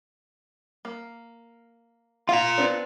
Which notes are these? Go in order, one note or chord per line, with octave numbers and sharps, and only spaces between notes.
A#3
F4 F5 A#5
B3 C4 D4